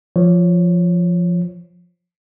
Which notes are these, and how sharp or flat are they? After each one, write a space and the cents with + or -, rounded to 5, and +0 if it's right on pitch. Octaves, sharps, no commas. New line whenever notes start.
F3 +0 C#5 +0